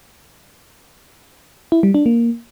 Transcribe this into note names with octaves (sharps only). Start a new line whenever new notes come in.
E4
G3
D4
A#3